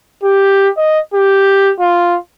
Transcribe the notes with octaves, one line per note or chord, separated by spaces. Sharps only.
G4
D#5
G4
F4